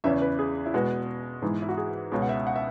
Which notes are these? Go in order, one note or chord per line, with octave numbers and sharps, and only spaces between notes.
E2 C#3 E3 C#4 E5
B4
G#4
E4
B2 G#3 B3 F#4
G#2 E3 G#3 B3
E4
F#4
G#4
C#2 B2 G#3 C#4
F#5
E5
F#5
E5